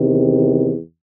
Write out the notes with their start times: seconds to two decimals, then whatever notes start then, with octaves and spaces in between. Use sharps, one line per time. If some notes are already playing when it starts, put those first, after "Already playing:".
Already playing: E2 C3 D#3